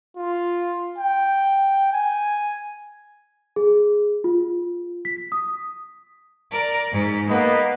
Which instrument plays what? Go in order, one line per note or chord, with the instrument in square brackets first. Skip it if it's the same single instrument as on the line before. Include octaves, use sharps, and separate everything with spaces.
[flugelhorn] F4
G5
G#5
[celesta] G#4
F4
B6
D#6
[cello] A#4 D5
G#2
[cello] A#3 [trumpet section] B3 B4 D#5